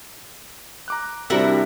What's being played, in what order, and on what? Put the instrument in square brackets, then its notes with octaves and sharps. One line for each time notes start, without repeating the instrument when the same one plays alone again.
[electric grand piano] A#5 D6 F#6
[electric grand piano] C3 G3 D4 [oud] E4 F#4 A#4